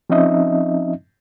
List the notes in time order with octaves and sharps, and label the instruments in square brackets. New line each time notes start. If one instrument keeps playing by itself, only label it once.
[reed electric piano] F3 C4 C#4 D#4 D#5 E5